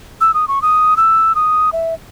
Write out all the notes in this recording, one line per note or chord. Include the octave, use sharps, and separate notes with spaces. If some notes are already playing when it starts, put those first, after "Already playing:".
E6
D#6
C#6
D#6
E6
D#6
E5